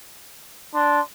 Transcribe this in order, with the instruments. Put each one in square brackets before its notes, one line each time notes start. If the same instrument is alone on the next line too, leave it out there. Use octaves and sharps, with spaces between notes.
[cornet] D4 [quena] C6